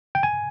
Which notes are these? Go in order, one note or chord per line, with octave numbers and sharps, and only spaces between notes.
G5
G#5